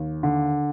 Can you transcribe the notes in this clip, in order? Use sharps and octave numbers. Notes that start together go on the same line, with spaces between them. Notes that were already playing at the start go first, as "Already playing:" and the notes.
Already playing: D#2
D3